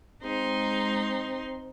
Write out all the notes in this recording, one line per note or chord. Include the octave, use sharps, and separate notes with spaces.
G#3 C4 D#4 C6